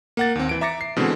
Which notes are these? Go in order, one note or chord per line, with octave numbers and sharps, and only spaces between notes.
A#3 F#5 A6
D#2 C4
E3 D7
E5 A#5 D6 A6 A#6 C#7
C7
B2 D3 E3 G#3 C4